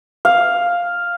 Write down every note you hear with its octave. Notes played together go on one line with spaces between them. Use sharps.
F5